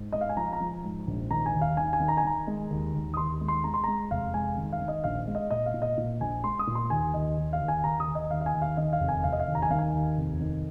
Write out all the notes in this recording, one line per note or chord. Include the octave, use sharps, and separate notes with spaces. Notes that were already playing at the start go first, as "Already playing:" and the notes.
Already playing: G#2
G#3 D#5
F5
G#5
F3 A#5
A#5
F3
G#2
A#1
D#3 A#5
G#5
D#2
F5
D#3 G#5
G#5
D#3
A#5
G#5
D#3 A#5
G#3
D#2
D#2
D#6
D#2 C6
G#3
C6
G#3 A#5
C6
G#3 A#5
F1 F5
G#3 G#5
D#3
F5
D#3
D#5
A#1 F5
G#3
D#5
A#2 D#5
F5
A#2
D#5
A#2
A#1 G#5
G#3 C6
D#6
A#2
C6
D#2 G#5
D#2 D#5
D#2
F5
D#2
G#5
D#2 A#5
D#6
D#2
D#5
D#2 F5
F5
G#5
D#2
F5
D#3 D#5
F5
F1
G#5
F1 F5
D#5
F5
D#2
A#5
G#5
D#3 F5
G#5
D#2
F1
D#3